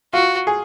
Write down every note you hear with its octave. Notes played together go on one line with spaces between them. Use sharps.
F4 F#4
G#4